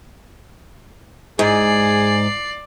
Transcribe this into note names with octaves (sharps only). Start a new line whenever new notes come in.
G#2 G#4 D5 C7